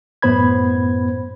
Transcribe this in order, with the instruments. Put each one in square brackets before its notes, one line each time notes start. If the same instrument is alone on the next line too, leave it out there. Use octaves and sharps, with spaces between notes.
[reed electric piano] F#2 A2 B3 C5 B5 G#6